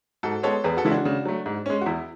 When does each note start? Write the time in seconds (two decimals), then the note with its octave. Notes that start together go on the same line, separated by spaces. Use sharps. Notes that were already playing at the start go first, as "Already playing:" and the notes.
0.23 G#2 F#4 A4
0.43 G#3 B3 A4 C#5
0.64 E2 G#4 B4
0.77 F#4 A4
0.85 C#3 E3 G#3 E4
0.91 D4 F#4
1.05 C#3
1.26 F#3 A3
1.46 G#2
1.66 G#3 C#4
1.81 F#4
1.86 E2 E4